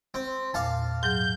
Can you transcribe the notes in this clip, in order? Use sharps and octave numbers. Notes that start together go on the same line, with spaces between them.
C4
E2 A#2 F5 A5 D6
G#2 F#3 G#4 G6